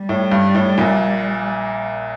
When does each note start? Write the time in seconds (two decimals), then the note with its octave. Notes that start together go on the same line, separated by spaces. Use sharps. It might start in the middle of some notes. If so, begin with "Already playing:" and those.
Already playing: G3
0.09 A2
0.32 G2
0.55 A2
0.78 A#1 A#2